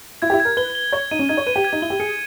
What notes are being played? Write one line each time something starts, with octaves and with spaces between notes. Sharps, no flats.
E4 G#6
G4
E4
G#6
A#4
B4 G7
G7
C#5 G#6
D#4 D#7
C#4
D#4 G#6
C#5
B4 D#7
G4
G#6
D#4
E4 G7
G4
G#4 C#7